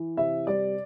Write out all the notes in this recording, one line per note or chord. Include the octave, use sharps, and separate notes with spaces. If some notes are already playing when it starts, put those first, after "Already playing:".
Already playing: E3
C3 E5
G3 D5